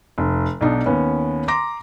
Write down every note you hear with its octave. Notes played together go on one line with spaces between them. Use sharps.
F1
B1 B2 D4 D#4
D#2 B3 C#4 B4
A#5 C6 D6 A#6